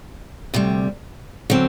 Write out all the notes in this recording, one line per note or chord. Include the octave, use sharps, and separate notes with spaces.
D2 C3 G3
D3 F#3 C4